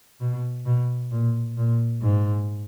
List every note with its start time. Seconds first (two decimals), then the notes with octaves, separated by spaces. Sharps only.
0.20 B2
0.66 B2
1.11 A#2
1.57 A#2
2.02 G#2